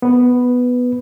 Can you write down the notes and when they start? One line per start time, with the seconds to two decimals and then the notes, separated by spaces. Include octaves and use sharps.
0.02 B3 B4